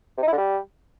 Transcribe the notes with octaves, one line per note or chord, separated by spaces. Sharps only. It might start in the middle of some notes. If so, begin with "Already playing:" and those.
C3
D#4
E4
D3
G3